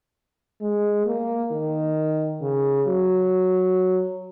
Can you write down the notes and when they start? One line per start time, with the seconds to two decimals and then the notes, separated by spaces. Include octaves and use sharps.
0.61 G#3
1.06 A#3
1.51 D#3
2.42 C#3
2.87 F#3